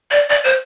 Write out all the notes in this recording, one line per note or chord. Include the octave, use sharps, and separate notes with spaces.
D5
D5
C5